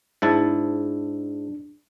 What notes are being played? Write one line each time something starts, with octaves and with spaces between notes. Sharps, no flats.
G#2 D4 E4 A5